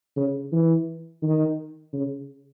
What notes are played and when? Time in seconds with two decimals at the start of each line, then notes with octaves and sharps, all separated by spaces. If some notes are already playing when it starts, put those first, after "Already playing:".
0.17 C#3
0.52 E3
1.23 D#3
1.93 C#3